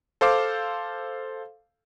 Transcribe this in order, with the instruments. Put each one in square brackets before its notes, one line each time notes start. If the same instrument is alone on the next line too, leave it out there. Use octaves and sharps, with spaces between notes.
[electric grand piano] A4 C5 F5 D6